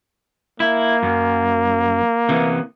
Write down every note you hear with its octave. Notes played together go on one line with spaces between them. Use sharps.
A#3 E4
F#2
C3 E3 B3